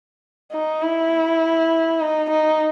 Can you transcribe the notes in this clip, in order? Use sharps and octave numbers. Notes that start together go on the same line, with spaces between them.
D#4
E4
D#4
D#4